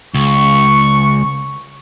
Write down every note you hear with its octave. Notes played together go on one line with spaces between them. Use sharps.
C#2 C#6